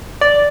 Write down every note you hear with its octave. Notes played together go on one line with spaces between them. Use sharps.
D5